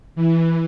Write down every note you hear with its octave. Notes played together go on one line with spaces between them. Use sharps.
E3